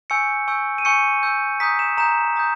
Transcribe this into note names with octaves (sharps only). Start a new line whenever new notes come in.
G#5 C#6 E6 G6 C#7
G#5 C#6 E6 G6
D#7
G#5 C#6 E6 G6 C#7
G#5 C#6 E6 G6
A#5 D#6 G6 B6
E7
A#5 D#6 G6 E7
A#5 D#6 G6